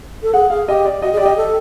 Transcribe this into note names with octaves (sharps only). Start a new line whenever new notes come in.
A4
G#4 F#5
G#4 F5
G4 D#5
D5
F#4 D#5
G#4
G4 D5
D#5
A4